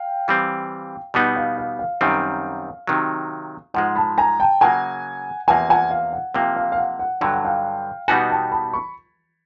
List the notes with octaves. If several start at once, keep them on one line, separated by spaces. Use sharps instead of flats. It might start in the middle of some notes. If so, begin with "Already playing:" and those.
Already playing: F5 G5
E3 G3 C4
B2 G3 B3 D#4 F#5
F5
F5
F5
F#2 D#3 G3 C4
C3 D#3 F#3
G#2 F3 G#3 F#5
A5 B5
G#5 A#5
G5 A5
C#3 F#3 A#3 F#5 G#5
E2 C3 F3 A#3 F#5 G#5
F#5 G#5
F5
F#5
C3 F3 A#3 F5 G5
F5 G5
F5
F#5
F#5
G2 D3 F#3 G5
F#5
F5 G5
B2 G3 B3 D#4 F#4 F#5 G#5
G5 A5
A5 B5
B5 C#6